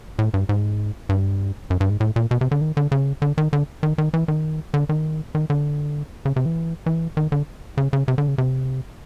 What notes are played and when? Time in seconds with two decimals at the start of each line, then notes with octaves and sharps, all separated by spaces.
0.19 A2
0.34 G2
0.49 G#2
1.09 G2
1.70 F#2
1.80 G2
1.90 G#2
2.00 A2
2.16 A#2
2.31 B2
2.41 C3
2.51 D3
2.61 D#3
2.77 D3
2.92 C#3
3.22 D3
3.38 D#3
3.53 D3
3.83 D#3
3.98 D#3
4.14 E3
4.28 D#3
4.74 D3
4.89 D#3
5.35 D#3
5.50 D3
6.25 C#3
6.36 C3
6.46 E3
6.86 E3
7.17 D#3
7.32 D3
7.77 C#3
7.93 C#3
8.08 C3
8.18 D3
8.28 C#3
8.38 C3